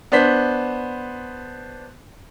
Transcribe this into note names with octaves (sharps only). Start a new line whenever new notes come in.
B3 D4 C5 B6